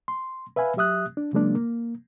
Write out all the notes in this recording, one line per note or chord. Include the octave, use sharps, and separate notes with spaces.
C6
B4 E5 F5 G#5 B5
F#3 G4 E5 D#6 F#6
D4
C#3 F#3 G#3 A#3 D4
A#3